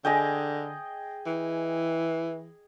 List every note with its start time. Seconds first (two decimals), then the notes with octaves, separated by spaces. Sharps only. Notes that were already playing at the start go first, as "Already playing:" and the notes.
0.05 D3 G#4 D#5 G5
1.26 E3